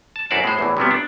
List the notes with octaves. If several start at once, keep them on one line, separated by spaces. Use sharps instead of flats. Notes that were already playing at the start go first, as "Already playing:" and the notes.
A5
F#2 E4 F#4 C5 D5 A5
A2 G#3 C5
E2 A2 E3
C3 F#3 G3 B3
D4